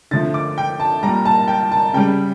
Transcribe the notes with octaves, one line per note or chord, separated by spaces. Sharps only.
D3 F3 A3 A6
D6
G5
A5
A#2 G3 A#5
A5
G5
A5
C#3 G3 G5